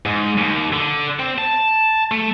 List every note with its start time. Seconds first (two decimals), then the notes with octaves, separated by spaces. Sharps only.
0.06 G#2
0.38 D#2
0.73 D3
1.19 C4
1.38 A5
2.12 A3